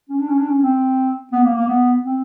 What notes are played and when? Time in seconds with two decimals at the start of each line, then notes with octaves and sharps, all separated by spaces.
0.09 C#4
0.19 D4
0.29 C#4
0.38 D4
0.48 C#4
0.62 C4
1.32 B3
1.44 A#3
1.55 A#3
1.67 B3
2.02 C4